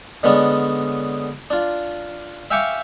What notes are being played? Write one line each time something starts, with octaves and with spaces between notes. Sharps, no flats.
D3 G#3 B3 C#4 D4
D4 F4
E5 F5 G5 G#5 C#6 D6